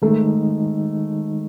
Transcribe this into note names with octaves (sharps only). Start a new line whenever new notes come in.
D#3 G#3 A3 D#4